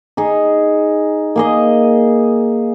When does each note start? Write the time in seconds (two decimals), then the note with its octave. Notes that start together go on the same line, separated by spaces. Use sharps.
0.17 D#4 G#4
1.36 A#3 G#4 D#5